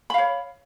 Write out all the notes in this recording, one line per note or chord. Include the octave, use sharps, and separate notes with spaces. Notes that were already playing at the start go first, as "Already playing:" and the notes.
C#5 F5 B5